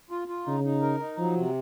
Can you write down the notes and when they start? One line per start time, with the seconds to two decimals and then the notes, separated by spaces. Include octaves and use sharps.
0.11 F4
0.28 F4
0.46 C#3 D#4
0.64 D#4
0.82 A#4
1.00 D#4
1.18 F3 F#3
1.36 C3